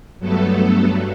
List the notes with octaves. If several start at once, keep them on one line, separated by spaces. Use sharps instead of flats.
G2 F#3 A3 B3 A4